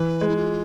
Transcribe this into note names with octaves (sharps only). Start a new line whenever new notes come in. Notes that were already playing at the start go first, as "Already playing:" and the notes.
Already playing: E3 B4
G#3
E4
F4